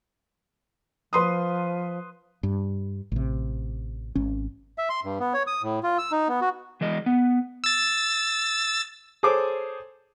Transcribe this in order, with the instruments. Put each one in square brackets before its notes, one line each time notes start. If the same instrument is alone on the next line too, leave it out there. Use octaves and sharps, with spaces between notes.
[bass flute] F3 [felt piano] B4 C6 D#6
[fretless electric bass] G2
A1 C3
G#1 C#4
[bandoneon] E5
C6
G2
B3
C#5
D#6
A2
F4
E6
D#4
B3
F#4
[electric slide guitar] E3 G#3 D#5
B3
[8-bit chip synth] E6 A6
[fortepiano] G#4 A4 C5 C#5 D6